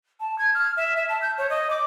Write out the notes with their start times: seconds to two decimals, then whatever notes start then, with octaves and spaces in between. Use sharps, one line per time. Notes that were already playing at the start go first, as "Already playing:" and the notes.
0.20 A5
0.38 G#6
0.54 F6
0.77 E5
0.96 E5
1.09 A5
1.22 G6
1.38 C#5
1.50 D#5
1.70 D6